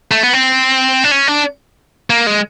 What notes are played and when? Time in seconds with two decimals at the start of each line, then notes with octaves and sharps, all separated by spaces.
0.11 A3
0.23 B3
0.33 C4
1.04 D4
1.11 C#4
1.27 D4
2.10 A#3
2.27 G#3